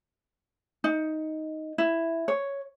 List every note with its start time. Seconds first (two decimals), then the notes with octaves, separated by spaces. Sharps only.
0.84 D#4
1.78 E4
2.28 C#5